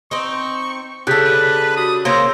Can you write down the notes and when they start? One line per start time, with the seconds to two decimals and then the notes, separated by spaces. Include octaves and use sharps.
0.11 C4 D#4 C#6
1.07 C#3 D4 G4 A4 F#6 G6 B6
1.25 B4
1.77 F#4 D#6
2.05 C#3 A#3 C5 C#5 A#5 C6 E6